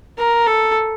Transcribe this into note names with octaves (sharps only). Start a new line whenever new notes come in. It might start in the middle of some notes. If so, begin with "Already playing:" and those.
A#4
A4